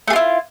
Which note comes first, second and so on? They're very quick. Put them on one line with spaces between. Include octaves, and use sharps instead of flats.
A3 G#4 F4 E4